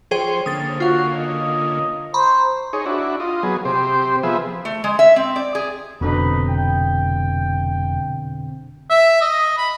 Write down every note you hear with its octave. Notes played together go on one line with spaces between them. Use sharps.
F3 G#4 C5 C#5 G5 C6
D3 A#3 C#4 D#6 A6
F4 F#4 F5
D#5
C5 A#5 B5 C#6
D#4 G#4 C#5
D4 E4 F#4
F4 D#5
F#3 B3 G#4
C3 G4 C5
F3 B3 G#4 E5
A3
G#3
E5
C4
D5
G#4
F1 B2 D3 C4 D#4 B4
G5
E5
D#5
B5